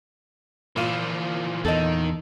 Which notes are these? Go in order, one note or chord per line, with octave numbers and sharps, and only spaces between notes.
A#2 E3 F3 F4 E7
E2 D#3 A4 D#5